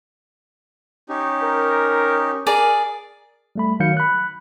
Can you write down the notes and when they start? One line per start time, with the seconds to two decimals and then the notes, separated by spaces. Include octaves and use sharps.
1.09 C#4 D#4 G4
1.43 A#4
2.47 G#4 A#4 D5
3.56 G3 A3 B5
3.80 D#3 F#3 F5 G6 C#7
3.97 B5 F#6